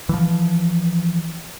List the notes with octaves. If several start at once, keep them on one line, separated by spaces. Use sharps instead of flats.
E3 F3